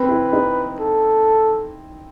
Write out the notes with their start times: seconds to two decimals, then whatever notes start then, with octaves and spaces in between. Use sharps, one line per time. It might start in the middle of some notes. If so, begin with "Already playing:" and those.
Already playing: C4 B4
0.09 E4
0.33 D#4
0.80 A4